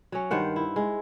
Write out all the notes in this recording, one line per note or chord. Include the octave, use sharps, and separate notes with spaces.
F#3 C#4
G2 D#3 C5 F#5
E4
G#3